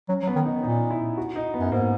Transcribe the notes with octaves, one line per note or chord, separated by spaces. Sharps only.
F#3 C#4
F#3
B3
D#3
D#4
A#2 D#4
E4
F#4
D#4
B3
F#2
G#2 A#3